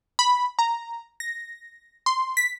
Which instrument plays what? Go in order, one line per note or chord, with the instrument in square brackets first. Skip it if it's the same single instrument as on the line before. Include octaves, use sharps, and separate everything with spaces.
[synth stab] B5
A#5
A#6
C6
B6